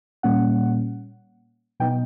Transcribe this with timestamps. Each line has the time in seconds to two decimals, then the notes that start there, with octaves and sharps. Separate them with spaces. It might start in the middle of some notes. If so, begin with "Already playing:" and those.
0.23 A#2 G3 A#3 C#4 F#5
1.80 B2 F#3 B3 D#4 G5